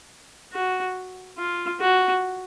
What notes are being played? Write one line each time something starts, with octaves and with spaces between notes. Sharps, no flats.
F#4
F4
F#4